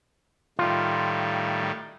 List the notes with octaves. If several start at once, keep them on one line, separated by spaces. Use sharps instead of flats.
A2 D#3 G3 F4